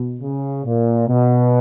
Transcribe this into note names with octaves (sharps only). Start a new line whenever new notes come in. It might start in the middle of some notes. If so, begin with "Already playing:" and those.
Already playing: B2
C#3
A#2
B2